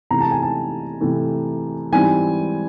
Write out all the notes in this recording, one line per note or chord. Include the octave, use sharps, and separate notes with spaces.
C3 E3 A3 A#5
A5
G#5
A5
C3 E3 A3
G#2 E3 G3 C4 G#5